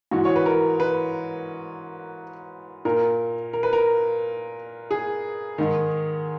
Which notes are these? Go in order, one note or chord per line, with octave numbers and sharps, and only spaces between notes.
G#2 E3 F#4
C#5
B4
A#4
B4
A#2 A#4
A#4
B4
A#4
G#4
G#2 D#3